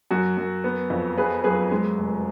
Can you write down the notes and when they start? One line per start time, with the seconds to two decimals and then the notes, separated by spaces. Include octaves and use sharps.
0.11 F#2 F#4
0.37 F#2
0.64 B3
0.90 F2
1.17 B3 G#4 B4
1.44 F#2 G#4 B4
1.72 G#3
1.98 F1